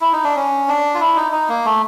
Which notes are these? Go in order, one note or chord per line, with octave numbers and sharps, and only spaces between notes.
E4
D#4
D4
C#4
D4
F4
E4
D#4
D#4
A#3
A3